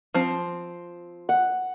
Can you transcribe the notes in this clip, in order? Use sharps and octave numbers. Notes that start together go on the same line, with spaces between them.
F3 C4
F#5